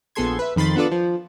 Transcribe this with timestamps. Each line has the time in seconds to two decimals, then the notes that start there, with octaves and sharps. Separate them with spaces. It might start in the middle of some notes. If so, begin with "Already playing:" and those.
0.15 A#1 B3 G#4 A4 C6 G#6
0.39 B4 E5
0.56 F2 D#3 B5 C6 A6
0.76 B3 D4 F4 A4 B4 D5
0.92 F3